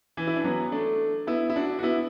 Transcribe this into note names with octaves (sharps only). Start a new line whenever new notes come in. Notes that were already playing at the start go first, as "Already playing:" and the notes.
E3
E4
D4
F#3 B3
A3 D4
B3 E4
E4
D4 F#4
F#4
B3 E4